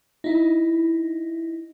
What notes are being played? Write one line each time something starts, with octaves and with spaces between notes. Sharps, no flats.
D#4 E4